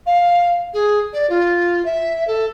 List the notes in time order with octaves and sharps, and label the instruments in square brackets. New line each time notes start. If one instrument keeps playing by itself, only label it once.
[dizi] F5
G#4
D5
F4
E5
A4